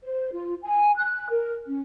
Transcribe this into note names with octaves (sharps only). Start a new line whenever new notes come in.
C5
F4
G#5
F#6
A#4
C#4